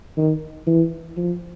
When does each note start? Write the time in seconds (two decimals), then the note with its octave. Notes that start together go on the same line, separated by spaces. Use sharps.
0.17 D#3
0.67 E3
1.17 F3